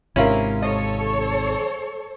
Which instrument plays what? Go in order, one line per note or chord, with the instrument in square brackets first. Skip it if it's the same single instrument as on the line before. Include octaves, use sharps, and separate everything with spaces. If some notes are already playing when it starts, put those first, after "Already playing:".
[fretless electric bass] G#1 G#2 C3 [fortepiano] C#4 F4 [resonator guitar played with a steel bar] E4 A#4
[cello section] A4 C#5 [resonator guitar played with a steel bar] D#5